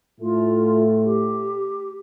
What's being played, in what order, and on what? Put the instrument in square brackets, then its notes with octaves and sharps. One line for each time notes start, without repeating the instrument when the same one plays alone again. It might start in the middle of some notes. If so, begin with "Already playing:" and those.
[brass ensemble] A2 A3 [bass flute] F4
[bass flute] G4